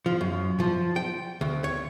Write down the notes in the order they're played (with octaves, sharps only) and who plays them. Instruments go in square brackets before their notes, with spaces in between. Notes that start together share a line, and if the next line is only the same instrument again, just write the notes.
[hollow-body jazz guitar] F3
F#2
F3
G5
D2
C#5